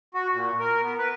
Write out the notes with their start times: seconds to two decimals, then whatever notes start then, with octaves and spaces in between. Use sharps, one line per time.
0.14 F#4
0.33 A#2
0.59 A#4
0.82 B3
0.98 B4